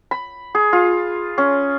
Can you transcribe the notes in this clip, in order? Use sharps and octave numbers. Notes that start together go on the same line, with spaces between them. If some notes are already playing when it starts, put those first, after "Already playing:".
B5
G#4
F4
C#4